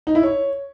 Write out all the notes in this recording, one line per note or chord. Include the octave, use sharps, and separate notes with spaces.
D#4
E4
C#5